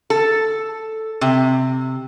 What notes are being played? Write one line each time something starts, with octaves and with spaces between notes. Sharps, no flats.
A4
C3